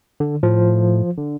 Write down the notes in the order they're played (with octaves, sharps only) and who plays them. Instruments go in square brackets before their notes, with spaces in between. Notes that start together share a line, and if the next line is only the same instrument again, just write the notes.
[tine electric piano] D3
[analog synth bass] A2 [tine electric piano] F3
[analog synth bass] D3